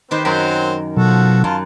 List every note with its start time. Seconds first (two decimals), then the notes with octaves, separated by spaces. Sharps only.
0.11 D#3 C4 G4 B4 C5
0.25 F#2 F#3 C4 A#4 G5 B5
0.96 B2 F3 F#3 F#4 A4
1.44 F#2 F4 A5